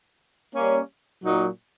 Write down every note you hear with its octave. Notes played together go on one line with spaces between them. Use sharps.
G3 A#3 C#4
A#2 F#3 A#3 D#4